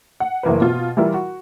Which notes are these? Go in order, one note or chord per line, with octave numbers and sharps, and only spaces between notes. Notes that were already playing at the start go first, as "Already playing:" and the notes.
F#5
F#1 E3 A#3 B4
B2 F4
E3 G3 E4 F4 A#4
F#4